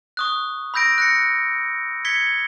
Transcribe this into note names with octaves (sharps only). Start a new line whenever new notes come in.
C#6 D#6 F#6
B5 E6 G6 A#6 D7
F#6 A#6 C#7
G#6 B6 C#7 G7